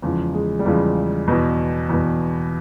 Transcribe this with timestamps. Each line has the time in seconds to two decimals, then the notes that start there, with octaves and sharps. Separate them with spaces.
0.02 E2 C#3 F3 G#3
0.34 G#3
0.59 G3
0.65 E2 C#3 F3 G#3
1.28 E2 B2
1.89 E2 B2